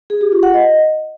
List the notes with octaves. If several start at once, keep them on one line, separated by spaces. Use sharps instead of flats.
G#4
G4
F4
F#5
D#5